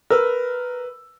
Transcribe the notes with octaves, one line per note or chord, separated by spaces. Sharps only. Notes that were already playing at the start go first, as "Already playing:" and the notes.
A#4 B4 E6